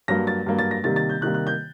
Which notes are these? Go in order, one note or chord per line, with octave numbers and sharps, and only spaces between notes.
G2 F#3 A#3 A#6
A6
G2 F#3 A#3
A6
A#6
C3 D#3 G3 A#3 A6
A6
G6
C3 D#3 G3 A#3 F#6
F#6
G6